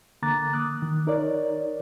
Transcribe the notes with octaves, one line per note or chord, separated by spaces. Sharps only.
D3 A#3 A#5 D6 F#6 A6
D6 D#6 F#6
D#3
D#4 A#4 C#5 D5